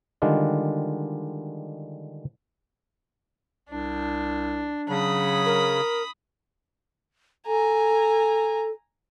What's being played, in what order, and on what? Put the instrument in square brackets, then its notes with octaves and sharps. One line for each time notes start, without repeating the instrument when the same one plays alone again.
[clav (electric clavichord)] D3 D#3 G3 G#3 D4 F4
[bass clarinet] C2 [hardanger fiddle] D4
[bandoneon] C#3 [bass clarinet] F#3 [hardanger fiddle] B5 D#6
[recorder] A#4
[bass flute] A4 [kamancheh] G#5 A#5